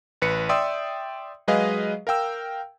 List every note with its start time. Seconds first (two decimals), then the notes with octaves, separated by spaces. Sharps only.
0.22 A1 B4 C#7
0.49 D5 E5 G5 C6 D#6 E6
1.48 F#3 G#3 G#4 B4 D#5 F5
2.07 A#4 F5 G5 E6